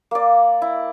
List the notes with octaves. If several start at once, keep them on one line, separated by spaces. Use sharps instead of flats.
A#3 D5
E4